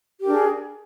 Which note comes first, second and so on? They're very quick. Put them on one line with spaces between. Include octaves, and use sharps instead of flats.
G4 A#4 D4 G#4